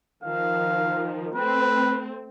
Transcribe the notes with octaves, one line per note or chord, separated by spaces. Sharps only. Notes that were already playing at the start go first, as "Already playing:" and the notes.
D#3 F3 F5
A3 C4 B4